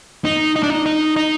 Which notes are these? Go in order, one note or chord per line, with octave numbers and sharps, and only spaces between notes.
D#4
D#4
D4
D#4
D#4
D#4